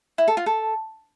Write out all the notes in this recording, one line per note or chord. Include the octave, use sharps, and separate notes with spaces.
E4
A4
F4
A4